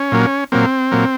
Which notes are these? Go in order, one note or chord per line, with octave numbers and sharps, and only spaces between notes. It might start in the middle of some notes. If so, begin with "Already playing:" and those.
Already playing: C#4
A#2 F#3 A#3
A#2 F#3 A#3 C4
A#2 F#3 A#3